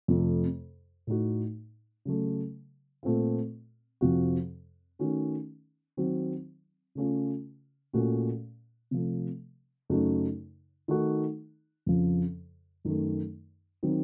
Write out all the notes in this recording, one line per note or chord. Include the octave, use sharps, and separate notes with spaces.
F2 C3 F3 A3
A2 A3 D#4 F#4
C#3 F#3 A3
A#2 A3 C4 F4
F2 C3 F3 C4 F#4
D#3 A3 C#4 F#4
D#3 F#3 C4 F#4
C#3 A3 C#4 F4
A#2 A3 C#4 F#4
C3 F3 A3
F#2 C#3 A3 D#4 F#4
D#3 A3 D#4 F#4
F2 C#3 F3
F#2 D#3 A3
D#3 F#3 C4